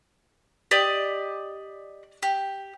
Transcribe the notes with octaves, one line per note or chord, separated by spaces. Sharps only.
G4 D5 D#5
G4